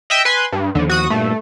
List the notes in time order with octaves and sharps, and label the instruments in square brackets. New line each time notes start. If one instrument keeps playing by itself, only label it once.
[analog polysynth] D#5 E5 G5
B4 G#5 C6
G2
[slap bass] D#2 F3 [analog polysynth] D3
[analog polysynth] F#4 D#6
[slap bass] G2 A#2 [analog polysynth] A3